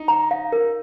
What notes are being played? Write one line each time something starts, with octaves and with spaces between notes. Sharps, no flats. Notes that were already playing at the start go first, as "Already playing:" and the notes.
Already playing: D#4
A#5
F5
A#4